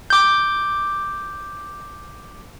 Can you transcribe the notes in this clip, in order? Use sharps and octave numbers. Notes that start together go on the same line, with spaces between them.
D6 G6